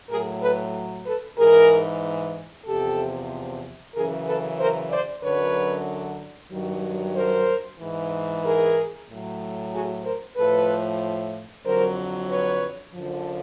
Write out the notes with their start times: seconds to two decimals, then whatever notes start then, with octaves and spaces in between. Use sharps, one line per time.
0.10 A2 F#3 G#4 A#4
0.42 A4 B4
1.06 A4 B4
1.38 G#2 E3 G#4 A#4
2.67 E2 C3 F3 G4 A4
3.95 F#2 C#3 E3 G#4 A#4
4.27 A4 B4
4.59 A#4 C5
4.91 C5 D5
5.23 F#2 D3 F#3 B4 C#5
6.52 G2 D#3 F#3
7.16 A#4 C5
7.80 G#2 E3
8.44 G#4 A#4
9.08 A2 F#3
9.73 F#4 G#4
10.05 A#4 C5
10.37 A2 F3 A4 B4
11.65 F2 D3 F#3 A#4 C5
12.29 B4 C#5
12.94 F#2 D3 F3